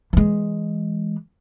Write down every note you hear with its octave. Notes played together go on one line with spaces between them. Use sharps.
E3 G#3